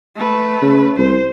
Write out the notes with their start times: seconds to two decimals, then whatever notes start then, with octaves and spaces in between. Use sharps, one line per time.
0.16 A3 B4
0.62 C#3
0.98 C2 C5